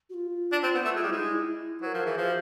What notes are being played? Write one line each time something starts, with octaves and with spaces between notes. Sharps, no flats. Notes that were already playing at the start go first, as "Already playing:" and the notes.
F#4
F4
D4
C4
B3
A3
G#3 F4
G3
E4
G#3
D#4
E4
F#3 A#4 C5
F3
E3 G#4
F3
F#4